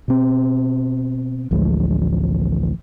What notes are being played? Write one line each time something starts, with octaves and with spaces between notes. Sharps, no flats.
B2 C4
A1 D2 F3 G#3